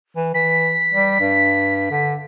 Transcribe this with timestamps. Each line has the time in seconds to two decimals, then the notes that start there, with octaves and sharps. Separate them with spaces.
0.17 E3
0.34 E3 B6
0.93 G3
1.20 G2
1.91 D3